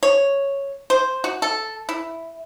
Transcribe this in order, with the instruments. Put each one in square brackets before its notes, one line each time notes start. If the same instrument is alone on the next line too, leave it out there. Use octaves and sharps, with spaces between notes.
[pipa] C#5
C5
F#4
A4
E4